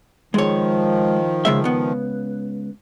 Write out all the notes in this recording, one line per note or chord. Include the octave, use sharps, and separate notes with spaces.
D#3 F3 G#3 C#5
C#3 G#3 E5
C#2 B3